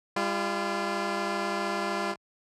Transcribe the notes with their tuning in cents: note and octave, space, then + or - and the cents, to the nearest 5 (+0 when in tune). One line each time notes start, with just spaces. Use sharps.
G3 +35 F4 -25